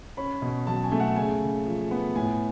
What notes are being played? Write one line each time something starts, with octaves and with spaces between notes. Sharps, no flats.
C#4 B5
B2
F#3 A5
G#5
A3
F#5
C#3 G#5
C#3
F3
B3
A2 G#5